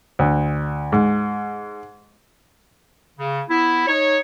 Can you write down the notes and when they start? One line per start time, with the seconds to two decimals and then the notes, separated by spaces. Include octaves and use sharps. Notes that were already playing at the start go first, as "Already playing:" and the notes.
0.19 D2
0.93 G#2
3.18 C#3
3.50 B3 E4
3.87 D#4 C#5